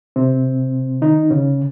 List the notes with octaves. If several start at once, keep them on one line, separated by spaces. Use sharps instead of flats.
C3 C4
D#3 D#4
C#3 C#4